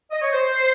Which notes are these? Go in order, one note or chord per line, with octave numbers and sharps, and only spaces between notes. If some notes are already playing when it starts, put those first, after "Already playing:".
D#5
C#5
C5